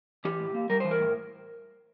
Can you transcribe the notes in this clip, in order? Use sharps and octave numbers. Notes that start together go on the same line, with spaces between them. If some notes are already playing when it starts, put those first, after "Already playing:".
E3 G4
A2
A#3
G3 A#4
E3 C5
A#4
A2